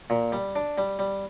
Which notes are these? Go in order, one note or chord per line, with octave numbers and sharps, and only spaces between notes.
A#2
G3
D4
G3
G3